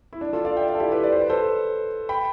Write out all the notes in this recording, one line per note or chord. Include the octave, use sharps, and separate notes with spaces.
E4
D4
F4 A4
D5 F5
E5 G5
D5 F5
A4
E4 G4
G4 B4
D5
C5
B4
A4 C5
G5 B5